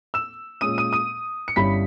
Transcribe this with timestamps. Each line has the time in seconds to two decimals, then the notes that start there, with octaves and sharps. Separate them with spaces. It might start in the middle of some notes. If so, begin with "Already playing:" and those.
0.14 E6 E7
0.61 A#2 G#3 C#4 D#6 D#7
0.78 D#6 D#7
0.93 D#6 D#7
1.48 C#7
1.56 G1 G2 G3 C#4 E4 B5 B6